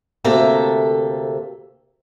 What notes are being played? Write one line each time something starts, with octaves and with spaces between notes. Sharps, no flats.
D2 C3 A#3 A4 E5 A#5